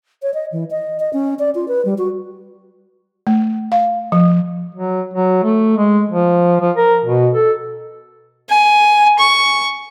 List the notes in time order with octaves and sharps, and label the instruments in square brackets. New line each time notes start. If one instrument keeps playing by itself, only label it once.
[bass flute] C#5
D#5
E3
D#5
D#5
C#4
D5
F4
B4
G3
F#4
[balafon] A3
F5
F3
[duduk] F#3
F#3
A3
G#3
F3
F3
A#4
B2
A4
[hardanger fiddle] G#5
C#6